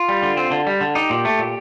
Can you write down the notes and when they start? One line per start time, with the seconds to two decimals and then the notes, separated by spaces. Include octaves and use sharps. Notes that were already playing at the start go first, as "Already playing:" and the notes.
Already playing: F4
0.09 G3
0.22 D3
0.37 C4
0.51 D3
0.67 G3
0.81 D3
0.95 D#4 G4
1.10 A#2
1.25 A3
1.39 A#2